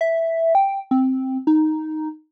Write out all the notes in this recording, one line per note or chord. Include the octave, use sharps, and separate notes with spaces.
E5
G5
C4
D#4